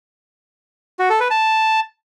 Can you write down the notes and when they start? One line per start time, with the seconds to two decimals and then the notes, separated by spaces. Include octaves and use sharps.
0.99 F#4
1.10 A4
1.20 B4
1.30 A5